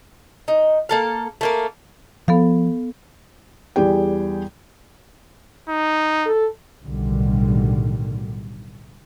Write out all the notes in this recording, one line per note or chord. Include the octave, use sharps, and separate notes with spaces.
D#4
A#3 A4 F5
A3 A#3 A#4
F3 B3 A4 F5
E2 G3 G4 G#4 D5 G5
D#4
A4
B1 A2 D3 D#3 G3